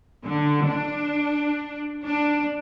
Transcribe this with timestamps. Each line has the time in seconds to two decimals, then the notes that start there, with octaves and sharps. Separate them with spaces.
0.25 D3
0.66 D4
2.04 D4